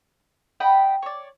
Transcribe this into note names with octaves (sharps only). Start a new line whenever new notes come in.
D#5 F#5 G5 B5
C#5 D5